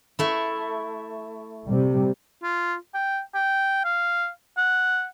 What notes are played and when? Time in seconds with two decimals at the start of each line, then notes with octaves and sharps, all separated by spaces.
0.19 A3 E4
1.66 C3 G3
2.43 F4
2.94 G5
3.35 G5
3.85 F5
4.57 F#5